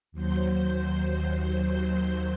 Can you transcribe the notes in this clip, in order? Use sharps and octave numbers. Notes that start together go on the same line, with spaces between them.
D#2 F#3 C5 G6